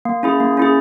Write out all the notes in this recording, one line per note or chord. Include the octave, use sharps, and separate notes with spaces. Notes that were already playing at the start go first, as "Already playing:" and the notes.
A#3
C#4 E4 G#4
A#3
C#4 E4 G#4